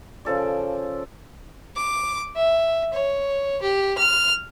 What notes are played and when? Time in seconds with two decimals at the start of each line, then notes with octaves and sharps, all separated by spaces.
0.25 C#3 F3 A4 D5
1.76 D6
2.36 E5
2.93 C#5
3.61 G4
3.98 F6